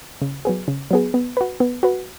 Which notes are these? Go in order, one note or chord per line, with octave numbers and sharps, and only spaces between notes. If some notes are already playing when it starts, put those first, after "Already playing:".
C#3
F#3 B3 G#4
C#3
F#3 B3 G#4
B3
F#4 B4
B3
F#4 B4